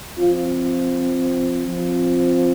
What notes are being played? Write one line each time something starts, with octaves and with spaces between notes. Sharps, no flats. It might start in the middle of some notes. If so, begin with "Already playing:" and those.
F3 C4 F4
F3 C4